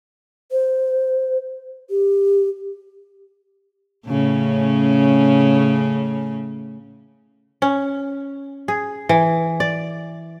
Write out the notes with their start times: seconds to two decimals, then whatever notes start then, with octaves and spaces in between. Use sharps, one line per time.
0.52 C5
1.90 G4
4.08 A2 C#3 C#4
7.62 C#4
8.68 G#4
9.09 E3
9.60 D5